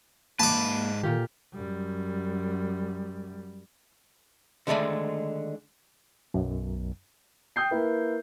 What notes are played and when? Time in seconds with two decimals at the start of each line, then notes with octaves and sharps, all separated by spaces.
0.40 G#2 A#3 B4 A5 D6
1.03 A#2 D#3 F4 G4
1.54 F#2 G3
4.67 D3 D#3 G#3 A3 D5 B5
6.34 B1 F#2
7.56 G5 D#6 G6 C7
7.71 A#3 E4 B4